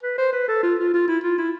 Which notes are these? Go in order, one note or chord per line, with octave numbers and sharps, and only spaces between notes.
B4
C5
B4
A4
F4
F4
F4
E4
F4
E4